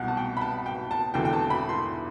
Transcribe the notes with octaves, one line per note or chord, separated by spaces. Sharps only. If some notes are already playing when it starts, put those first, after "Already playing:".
Already playing: C2 B2 F#5
A5
G5
B5
A5
G5
A5
E1 E2 D3 G5
G5
A5
B5
C6